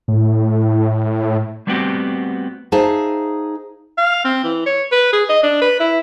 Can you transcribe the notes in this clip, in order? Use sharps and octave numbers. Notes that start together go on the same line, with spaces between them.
A2
G3 A3 B3 C4 F#4 G4
D#4 G#4 C5 E5 F5 A5
F5
C4
E3
C#5
B4
G#4
D#5
D4
B4
E4